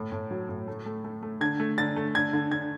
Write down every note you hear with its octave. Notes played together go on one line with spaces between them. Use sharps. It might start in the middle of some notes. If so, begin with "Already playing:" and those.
Already playing: A2
A2
F#3
A2
A3
A3
A3
A3
D3 G#6
A3
D3 A6
A3
D3 G#6
D3
D3 G#6